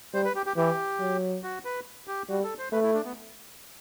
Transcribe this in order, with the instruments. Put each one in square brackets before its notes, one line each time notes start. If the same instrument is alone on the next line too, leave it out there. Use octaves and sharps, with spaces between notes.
[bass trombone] G3 [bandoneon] C5
[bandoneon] B4
G4
G4
[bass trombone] E3 [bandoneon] G4
[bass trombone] F#3
[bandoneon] F#4
B4
G4
[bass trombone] G3 [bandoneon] F#4
[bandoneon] A4
C5
[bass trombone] A3 [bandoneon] B4
[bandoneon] E4
D4
B3